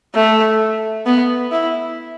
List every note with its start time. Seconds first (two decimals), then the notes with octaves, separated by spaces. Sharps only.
0.15 A3
1.06 B3
1.52 E4